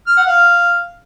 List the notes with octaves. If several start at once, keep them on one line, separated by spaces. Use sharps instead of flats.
F6
F#5
F5